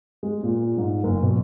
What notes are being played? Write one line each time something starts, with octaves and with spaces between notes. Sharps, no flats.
G#3
A#2
G#2
F#1
B2